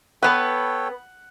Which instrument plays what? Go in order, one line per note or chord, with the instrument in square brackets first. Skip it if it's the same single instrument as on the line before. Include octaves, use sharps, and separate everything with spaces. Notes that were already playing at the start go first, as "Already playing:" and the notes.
[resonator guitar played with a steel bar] B3 B4 [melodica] A4 C#5 G5 [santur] F#5